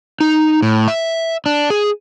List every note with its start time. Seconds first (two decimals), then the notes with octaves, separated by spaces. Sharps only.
0.21 D#4
0.62 A2
0.88 E5
1.46 D4
1.70 G#4